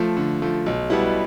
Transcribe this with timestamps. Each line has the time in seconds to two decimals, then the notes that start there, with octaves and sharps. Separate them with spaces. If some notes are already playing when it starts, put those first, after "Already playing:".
Already playing: F3 A3
0.17 D3
0.42 F3 A3
0.66 B1
0.90 B2 G3 B3 E4